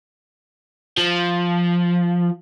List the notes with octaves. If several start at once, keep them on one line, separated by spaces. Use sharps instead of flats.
F3